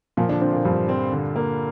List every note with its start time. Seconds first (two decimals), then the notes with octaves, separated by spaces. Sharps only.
0.17 A#2 F3 A#3
0.29 D3 D4
0.41 D3 C4 D4
0.53 A#2 A#3
0.65 G2 F3 G3
0.89 C4
1.12 D3
1.36 A#3